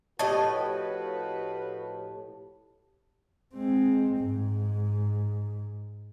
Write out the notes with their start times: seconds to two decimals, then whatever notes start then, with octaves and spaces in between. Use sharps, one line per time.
0.19 A2 F3 F#4 G4 B4 C#5 D#5 A5
3.54 G#3 C4
4.18 G#2